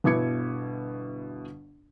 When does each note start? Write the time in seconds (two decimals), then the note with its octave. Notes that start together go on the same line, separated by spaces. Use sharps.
0.04 G1 B2 E4 D6 G#6 C#7